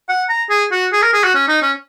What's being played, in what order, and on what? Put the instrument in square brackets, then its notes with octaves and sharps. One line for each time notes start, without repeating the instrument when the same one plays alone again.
[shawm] F#5
A#5
G#4
F#4
G#4
A#4
G#4
F#4
C#4
D#4
C#4